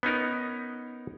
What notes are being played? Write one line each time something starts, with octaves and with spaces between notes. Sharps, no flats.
B3 C#4 D#4 A#4